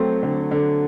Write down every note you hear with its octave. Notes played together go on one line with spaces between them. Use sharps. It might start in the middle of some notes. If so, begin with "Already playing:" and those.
Already playing: F#3 A3 C4
D3
D3